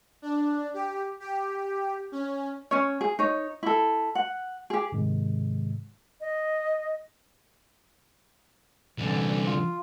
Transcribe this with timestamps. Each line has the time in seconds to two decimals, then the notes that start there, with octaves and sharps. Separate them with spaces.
0.22 D4
0.74 G4
1.20 G4
2.12 C#4
2.71 C#4 C#5
3.01 G#4
3.19 D#4 C#5
3.63 E4 A4
4.15 F#5
4.70 G4 G#4
4.92 G#2 C3 D#3 G#3
6.21 D#5
8.98 C2 D3 E3
9.46 F4